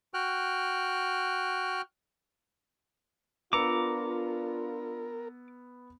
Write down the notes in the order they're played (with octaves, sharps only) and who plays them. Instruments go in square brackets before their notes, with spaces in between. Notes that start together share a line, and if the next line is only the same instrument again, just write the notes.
[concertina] F#4 G5 F6 F#6
[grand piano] B3 E6 C#7 [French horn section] D4 F4 [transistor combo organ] A#4 [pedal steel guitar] A#5 D6